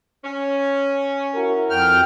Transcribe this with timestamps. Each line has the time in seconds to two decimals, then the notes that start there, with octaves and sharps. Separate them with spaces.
0.24 C#4
1.35 E4 F#4 A#4
1.70 F2 G5 F6